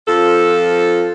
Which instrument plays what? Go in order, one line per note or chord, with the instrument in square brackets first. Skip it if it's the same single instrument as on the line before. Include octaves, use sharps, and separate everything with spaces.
[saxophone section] F2 F3 A4